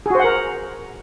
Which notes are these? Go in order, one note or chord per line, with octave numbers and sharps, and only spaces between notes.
F#4 G#4 A#4 C5 F#5